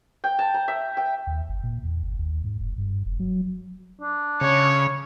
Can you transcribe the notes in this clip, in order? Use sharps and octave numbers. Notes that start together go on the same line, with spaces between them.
G5
A5
A#5
E5
G5
D#2
G1
A#2
E2
G1
D#2
G#2
F1
G2
F1
F#3
D4
C#3 C#5